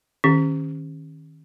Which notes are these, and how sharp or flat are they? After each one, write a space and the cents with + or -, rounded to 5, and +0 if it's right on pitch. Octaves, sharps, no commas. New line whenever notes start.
D#3 +0 C#4 -20 G4 +30